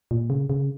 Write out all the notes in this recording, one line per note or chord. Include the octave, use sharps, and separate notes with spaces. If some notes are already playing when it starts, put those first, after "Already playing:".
A#2
C#3
C#3